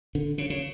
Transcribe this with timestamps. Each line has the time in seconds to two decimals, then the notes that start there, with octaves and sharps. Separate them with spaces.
0.15 D3
0.38 C#3
0.50 C#3